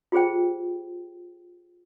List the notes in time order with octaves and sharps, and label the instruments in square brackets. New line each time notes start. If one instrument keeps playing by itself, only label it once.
[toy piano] F4 G4 G#4 C5 G5